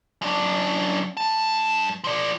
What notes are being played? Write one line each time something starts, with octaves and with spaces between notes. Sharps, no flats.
F#2 D4
G2 A5
F3 D5